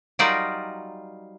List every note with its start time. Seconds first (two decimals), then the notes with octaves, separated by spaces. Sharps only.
0.19 F#3 G3 D#4 F4 A#4 D5